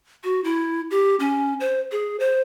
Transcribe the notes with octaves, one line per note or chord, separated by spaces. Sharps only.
F#4
E4
G4
C#4
C5
G#4
C5